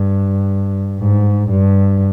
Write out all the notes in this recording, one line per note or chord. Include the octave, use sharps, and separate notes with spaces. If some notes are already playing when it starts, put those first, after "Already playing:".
Already playing: G2
G#2
G2